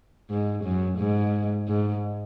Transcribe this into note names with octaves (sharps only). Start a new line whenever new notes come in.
G#2
F#2
G#2
G#2